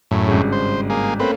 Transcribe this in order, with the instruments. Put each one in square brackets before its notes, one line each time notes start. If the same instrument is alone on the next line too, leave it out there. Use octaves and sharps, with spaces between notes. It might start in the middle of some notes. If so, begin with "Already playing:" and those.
[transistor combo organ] F#2 A2
[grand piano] G#1 G2 C#3
[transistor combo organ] C5
A#3 G#4
[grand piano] A3 A#3 C#4 [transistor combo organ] C4 B4